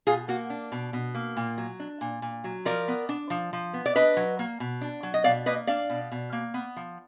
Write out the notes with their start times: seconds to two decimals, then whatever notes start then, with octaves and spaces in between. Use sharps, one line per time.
0.07 B2 F4 G#4
0.28 A#3 F#4
0.50 D4
0.72 B2
0.93 B2
1.15 A#3
1.37 A#2
1.58 F#3
1.80 D4
2.01 A#2
2.22 A#2
2.44 F#3
2.65 F3 A#4 D5
2.88 B3
3.09 D4
3.30 F3
3.53 F3
3.73 B3
3.86 D5
3.96 D4 B4 D#5
4.17 F#3
4.39 A#3
4.60 B2
4.81 D4
5.03 F#3
5.14 D#5
5.24 B2 D5 F5
5.46 A#3 B4 D#5
5.67 D4 D5 F5
5.90 B2
6.12 B2
6.33 A#3
6.54 B3
6.76 F3